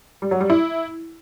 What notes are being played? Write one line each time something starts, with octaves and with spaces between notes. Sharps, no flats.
G3
F#3
G3
E4